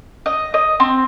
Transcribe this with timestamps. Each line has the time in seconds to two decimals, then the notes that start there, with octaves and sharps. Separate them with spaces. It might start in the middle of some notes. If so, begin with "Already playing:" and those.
0.26 D#5
0.54 D#5
0.80 C4